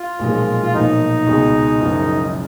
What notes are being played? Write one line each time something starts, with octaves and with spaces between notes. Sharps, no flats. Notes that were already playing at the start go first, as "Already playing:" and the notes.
Already playing: F4
B1 A#2 F3 G#3
F4
B1 A#2 F3 D#4
C#2 B2 G#3
F#1 F#2 F3